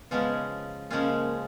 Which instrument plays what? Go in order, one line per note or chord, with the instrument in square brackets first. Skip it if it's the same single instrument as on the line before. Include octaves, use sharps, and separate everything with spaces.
[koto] C#3 F3 G#3 C#4 F4 [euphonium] B3
[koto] C#3 F3 G#3 C#4 F4 [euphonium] A#3